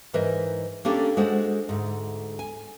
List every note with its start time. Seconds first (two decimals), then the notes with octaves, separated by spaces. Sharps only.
0.13 G#2 E3 A#4 C5 D#5
0.85 A#3 C#4 D4 G4 A4 G5
1.17 G#3 F#4 A4 C5 F#5
1.69 D2 G#2
2.39 G#5